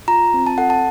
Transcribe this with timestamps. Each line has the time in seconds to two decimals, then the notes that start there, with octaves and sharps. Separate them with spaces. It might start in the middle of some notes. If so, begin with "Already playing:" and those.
0.08 F4 A#5
0.34 C4
0.47 A5
0.58 A4 F#5
0.70 A5